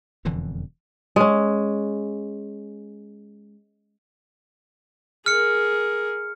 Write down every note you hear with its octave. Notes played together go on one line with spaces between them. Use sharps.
E1 F2 D3 E3
G#3 C#4
G#4 A#4 F6 C#7